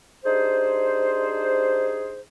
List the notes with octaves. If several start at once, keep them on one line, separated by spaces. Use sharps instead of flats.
D4 D#4 G4 G#4 C5